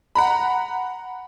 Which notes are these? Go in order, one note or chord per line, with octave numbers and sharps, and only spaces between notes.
F#5 A#5 B5